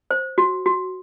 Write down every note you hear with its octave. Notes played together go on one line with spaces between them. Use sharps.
C5
F#4
F#4